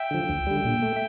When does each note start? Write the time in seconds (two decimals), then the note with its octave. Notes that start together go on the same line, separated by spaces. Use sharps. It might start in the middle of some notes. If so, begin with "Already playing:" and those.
Already playing: E5 G5
0.11 D3 F3
0.29 D2
0.47 D3 G3
0.65 A#2
0.82 A3